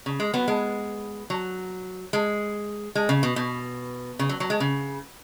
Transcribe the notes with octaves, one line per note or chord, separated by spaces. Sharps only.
C#3
G#3
F#3 B3
G#3
F#3
G#3
G#3
C#3
B2
B2
C#3
F#3
F#3
G#3
C#3